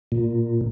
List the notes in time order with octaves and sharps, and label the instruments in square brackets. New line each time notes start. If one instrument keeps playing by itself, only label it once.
[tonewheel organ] A#2